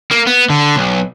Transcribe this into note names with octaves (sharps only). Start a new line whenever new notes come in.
A#3
B3
D3
B1